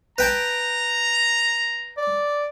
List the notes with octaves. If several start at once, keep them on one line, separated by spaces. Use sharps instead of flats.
B4 G5 A5 A#5
D5